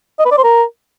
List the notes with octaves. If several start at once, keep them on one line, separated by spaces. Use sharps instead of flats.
D#5
B4
D5
C5
A#4